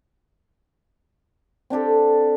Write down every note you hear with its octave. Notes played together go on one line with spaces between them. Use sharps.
C4 D4 G4 A4